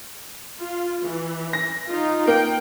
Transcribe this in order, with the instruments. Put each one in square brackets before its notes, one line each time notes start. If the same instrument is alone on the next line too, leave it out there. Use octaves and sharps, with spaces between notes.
[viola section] F4
E3
[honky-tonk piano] A#6
[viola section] D#4 F4
[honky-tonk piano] A#3 [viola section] G5